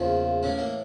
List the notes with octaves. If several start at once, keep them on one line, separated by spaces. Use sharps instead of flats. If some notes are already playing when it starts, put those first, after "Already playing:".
Already playing: E2 C#3 F3 A#3
A2 E3 C#4
A#3